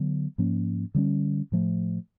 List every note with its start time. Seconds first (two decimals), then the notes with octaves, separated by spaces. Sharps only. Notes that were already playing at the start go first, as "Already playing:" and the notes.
Already playing: D3 F#3 B3
0.38 G#2 F3 A#3 C#4
0.95 D3 G3 A#3 C#4
1.52 A2 F3 A3